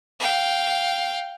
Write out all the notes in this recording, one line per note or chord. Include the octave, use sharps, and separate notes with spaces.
F5 G5